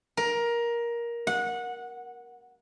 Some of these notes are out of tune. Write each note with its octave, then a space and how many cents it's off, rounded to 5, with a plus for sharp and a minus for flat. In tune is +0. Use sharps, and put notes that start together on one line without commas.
A#4 +15
F#5 -20